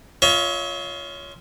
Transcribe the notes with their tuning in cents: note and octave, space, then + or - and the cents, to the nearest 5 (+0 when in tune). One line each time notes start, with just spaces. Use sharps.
F4 +0 C#5 +20 E5 -45